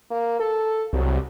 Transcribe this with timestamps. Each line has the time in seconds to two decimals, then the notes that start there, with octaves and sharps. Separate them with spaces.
0.11 A#3
0.39 A4
0.93 C2 F#3